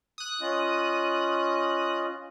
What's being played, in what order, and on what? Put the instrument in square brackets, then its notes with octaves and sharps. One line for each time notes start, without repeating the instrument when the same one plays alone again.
[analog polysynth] D#6 F#6
[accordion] C#4 F4 D#5